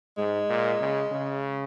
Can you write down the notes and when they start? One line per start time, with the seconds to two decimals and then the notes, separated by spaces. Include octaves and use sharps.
0.17 G#2 G#3
0.49 A#2
0.81 C#3
1.11 C#3